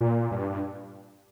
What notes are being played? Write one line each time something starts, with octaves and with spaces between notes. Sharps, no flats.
A#2
G2